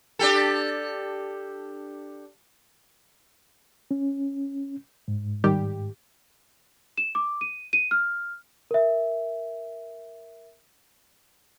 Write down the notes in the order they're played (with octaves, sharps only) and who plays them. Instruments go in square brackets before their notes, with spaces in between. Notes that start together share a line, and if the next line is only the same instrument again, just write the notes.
[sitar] D4 G4 A4
[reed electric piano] C#4
G#2
[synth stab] D#3 G3 G4
[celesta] E7
D6
D#7
D#7
F6
A#4 E5